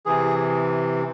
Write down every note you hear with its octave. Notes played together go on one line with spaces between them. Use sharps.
C3 E3 G#4